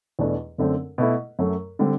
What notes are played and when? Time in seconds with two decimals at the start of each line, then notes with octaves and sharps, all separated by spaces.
0.19 E2 B2 A3 D4
0.58 F#2 D3 A3 C4
0.98 B2 A3 E4
1.39 F#2 F#3 A3
1.79 D3 G3 C4